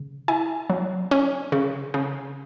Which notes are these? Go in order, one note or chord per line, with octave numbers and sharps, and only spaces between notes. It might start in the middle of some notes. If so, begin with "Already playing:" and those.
Already playing: C#3
E4 G#5
F#3
C#4
C#3
C#3